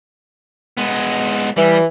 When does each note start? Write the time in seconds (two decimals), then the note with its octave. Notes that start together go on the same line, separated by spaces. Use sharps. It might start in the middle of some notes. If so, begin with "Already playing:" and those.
0.77 G#3 B3
1.57 E3 G3